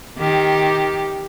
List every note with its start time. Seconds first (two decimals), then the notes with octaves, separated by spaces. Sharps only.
0.18 D#3 G4